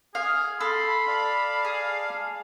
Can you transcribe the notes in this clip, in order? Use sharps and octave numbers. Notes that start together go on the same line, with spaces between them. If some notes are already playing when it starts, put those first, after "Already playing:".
G#4 F5
A4 B5 C6
D5 F5 A5
G#4